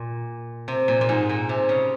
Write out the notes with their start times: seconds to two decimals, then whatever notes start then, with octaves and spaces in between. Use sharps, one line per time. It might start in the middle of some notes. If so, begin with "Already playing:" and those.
Already playing: A#2
0.68 C3
0.88 A#2
1.01 A#2
1.09 G#2
1.29 A#2
1.49 C3
1.69 C#3